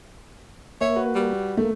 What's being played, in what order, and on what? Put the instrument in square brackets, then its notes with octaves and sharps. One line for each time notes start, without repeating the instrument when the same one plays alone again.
[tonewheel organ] A#3 [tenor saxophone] C#5 [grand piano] E5
[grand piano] F#4 B4
[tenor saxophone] G3
[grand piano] A3 [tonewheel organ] A#3